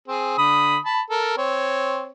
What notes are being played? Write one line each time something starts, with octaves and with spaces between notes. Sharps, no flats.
C4 G#4
D3 B5 D#6
A5 B5
A4 A#4
C4 C#5